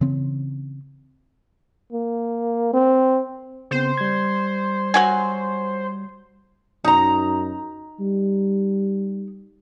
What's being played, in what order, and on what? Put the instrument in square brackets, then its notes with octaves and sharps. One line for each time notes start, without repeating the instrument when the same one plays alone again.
[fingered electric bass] C#3 E3 C4
[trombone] A#3
C4
[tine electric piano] C#3 B3 C4 [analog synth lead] C5
[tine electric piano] G3 G#6
[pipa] F#3 F#4 G#5
[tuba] F#2 [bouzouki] D#4 A#5
[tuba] G3